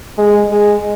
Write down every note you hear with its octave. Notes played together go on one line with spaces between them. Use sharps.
G#3
G#3